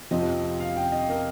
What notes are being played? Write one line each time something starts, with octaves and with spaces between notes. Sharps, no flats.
F2 C3 F3 C4 D#5
F5
G5
D#5
A#4